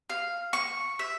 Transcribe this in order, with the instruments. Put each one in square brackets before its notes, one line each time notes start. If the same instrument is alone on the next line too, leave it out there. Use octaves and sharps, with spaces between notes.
[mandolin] F5
C#6
E5